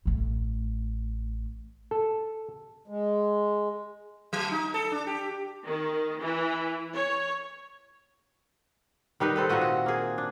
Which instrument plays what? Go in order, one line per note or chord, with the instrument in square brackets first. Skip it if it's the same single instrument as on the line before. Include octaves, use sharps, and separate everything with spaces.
[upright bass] A1 A3
[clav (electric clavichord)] A4
[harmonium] G#3
[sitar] F#3
D#4
A4
D4
G4
[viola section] D#3
E3
C#5
[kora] D#3 G3 D#4 B4
C4 A4 B4
A#2 C4 F#4 D#5
F#4
A#3 G#4
D4